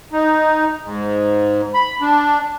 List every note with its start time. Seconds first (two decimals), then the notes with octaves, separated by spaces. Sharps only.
0.13 D#4
0.83 G#2
1.74 B5
2.01 D4